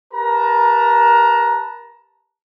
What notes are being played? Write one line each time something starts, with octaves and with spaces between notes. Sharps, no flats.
G4 A#4 B4 A5 A#5